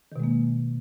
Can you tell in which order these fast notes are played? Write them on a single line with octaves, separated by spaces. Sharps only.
D#3 B2 G#3 A#3